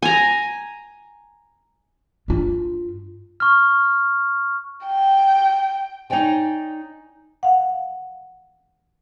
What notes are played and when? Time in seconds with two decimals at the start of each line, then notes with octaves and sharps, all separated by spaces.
0.02 G#5 A#5
2.28 G2 F4
3.40 C#6 F6
4.87 G5
6.10 D#4 C#5 D5 G5 G#5
7.43 F5 F#5